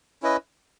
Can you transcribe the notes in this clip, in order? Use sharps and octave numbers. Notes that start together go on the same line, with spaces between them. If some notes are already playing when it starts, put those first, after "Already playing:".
C#4 E4 B4 D#5